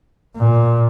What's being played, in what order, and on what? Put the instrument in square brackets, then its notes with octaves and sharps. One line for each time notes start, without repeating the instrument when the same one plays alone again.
[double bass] A#2